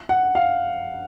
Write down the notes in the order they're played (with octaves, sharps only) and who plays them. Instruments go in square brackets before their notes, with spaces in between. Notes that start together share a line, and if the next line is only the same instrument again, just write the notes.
[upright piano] F#5
F5